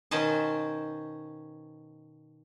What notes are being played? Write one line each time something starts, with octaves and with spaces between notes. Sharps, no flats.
B2 D#3 C#4 C5 D#5 A5